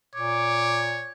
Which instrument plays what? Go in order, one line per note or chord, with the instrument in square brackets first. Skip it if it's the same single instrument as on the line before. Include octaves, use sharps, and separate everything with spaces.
[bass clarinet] A#2 [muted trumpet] C#5 [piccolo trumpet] D6